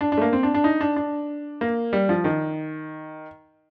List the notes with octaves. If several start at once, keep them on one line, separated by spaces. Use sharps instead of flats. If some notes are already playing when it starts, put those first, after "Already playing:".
D4
D4
A3
A#3
C4
D4
D4
D#4
D4
D4
A#3
G3
F3
D#3